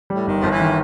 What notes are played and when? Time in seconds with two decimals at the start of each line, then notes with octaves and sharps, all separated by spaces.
0.10 A2 G3
0.26 G1 D#3
0.42 G1 F3
0.52 E3
0.60 D#3